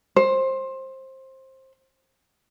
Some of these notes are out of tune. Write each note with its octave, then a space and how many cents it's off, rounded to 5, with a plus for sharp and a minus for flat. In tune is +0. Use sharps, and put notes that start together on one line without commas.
C5 +20